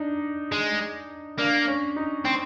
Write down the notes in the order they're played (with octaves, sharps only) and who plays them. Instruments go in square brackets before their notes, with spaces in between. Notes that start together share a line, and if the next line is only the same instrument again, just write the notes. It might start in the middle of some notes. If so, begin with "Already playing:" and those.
Already playing: [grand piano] D4 D#4
[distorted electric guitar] G#3
[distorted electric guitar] A#3 [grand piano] D4
[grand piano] C#4
D#4
[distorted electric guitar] C4